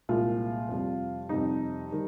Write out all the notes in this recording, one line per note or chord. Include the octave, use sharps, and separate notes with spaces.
C2 A#2 G#3 F4
F2 C3 G3
F2 C3 G3 D#4
D#3 G3